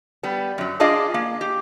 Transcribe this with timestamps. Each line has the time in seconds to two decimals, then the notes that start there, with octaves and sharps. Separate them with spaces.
0.23 G3 B3
0.58 F#2 F#3
0.80 D4 F4 G#4 D5 D#5 F5
1.14 A#3
1.41 G4